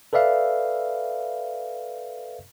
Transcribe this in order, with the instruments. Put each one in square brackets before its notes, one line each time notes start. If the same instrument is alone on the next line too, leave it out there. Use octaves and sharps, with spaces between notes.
[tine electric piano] A4 B4 D5 E5 F5